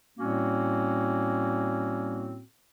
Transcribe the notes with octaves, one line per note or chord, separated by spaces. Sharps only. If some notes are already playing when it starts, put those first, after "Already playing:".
A2 G3 A#3 C4 C#4 F#4